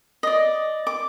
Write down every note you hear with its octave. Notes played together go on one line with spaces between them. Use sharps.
D5 D#5
D6